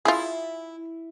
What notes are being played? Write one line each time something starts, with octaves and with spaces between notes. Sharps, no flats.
E4 F4 G#4